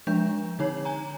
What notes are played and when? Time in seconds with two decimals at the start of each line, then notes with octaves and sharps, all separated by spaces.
0.07 F3 G#3 D4 G6
0.59 D3 D#4 C#5
0.85 G#5 A#5